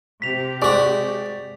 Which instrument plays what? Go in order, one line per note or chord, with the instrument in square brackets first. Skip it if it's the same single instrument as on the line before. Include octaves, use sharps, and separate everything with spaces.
[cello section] C3 G4 [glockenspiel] B6 F7
[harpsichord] G#3 F#4 [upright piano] D5 D6